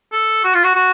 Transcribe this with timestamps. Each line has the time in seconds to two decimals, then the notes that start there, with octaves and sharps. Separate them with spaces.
0.12 A4
0.44 F#4
0.54 F4
0.64 F#4
0.76 F#4